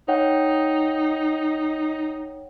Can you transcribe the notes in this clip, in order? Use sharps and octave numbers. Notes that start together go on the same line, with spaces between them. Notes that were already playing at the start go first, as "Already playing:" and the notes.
D#4 C#5 F#5 G5